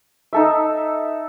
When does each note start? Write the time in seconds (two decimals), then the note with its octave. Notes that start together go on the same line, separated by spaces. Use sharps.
0.33 D#4 A4 E5